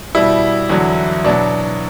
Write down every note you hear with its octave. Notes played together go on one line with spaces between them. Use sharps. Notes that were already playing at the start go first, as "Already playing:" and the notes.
B2 G3 E4
E2 D3 F#3
B2 F#3 D4